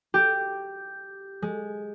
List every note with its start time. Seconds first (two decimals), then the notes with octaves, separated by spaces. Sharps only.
0.14 G4
1.42 G#3